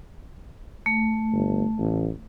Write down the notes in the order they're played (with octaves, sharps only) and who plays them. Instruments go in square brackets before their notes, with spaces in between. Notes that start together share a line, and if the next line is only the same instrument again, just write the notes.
[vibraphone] A3
[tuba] G1
A1